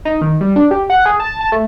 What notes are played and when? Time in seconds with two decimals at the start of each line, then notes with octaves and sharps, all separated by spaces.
0.05 D#4
0.21 D#3
0.41 G3
0.56 D4
0.71 G4
0.90 F#5
1.06 G#4
1.20 A5
1.41 A5
1.52 A3